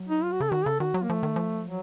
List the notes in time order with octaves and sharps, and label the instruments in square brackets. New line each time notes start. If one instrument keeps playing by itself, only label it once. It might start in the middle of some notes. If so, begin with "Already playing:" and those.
Already playing: [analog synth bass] F#3
[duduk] D#4
F4
F#4
[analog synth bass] C#3 [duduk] A4
[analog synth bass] D#3 [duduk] F#4
[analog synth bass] C#3 [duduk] A4
[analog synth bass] D#3 [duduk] F#4
[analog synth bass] F#3
[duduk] A#3
[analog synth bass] F3 [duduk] A3
[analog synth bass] D#3
F3
[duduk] F#3